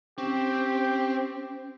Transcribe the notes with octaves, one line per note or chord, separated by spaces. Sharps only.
C4 C#4 G4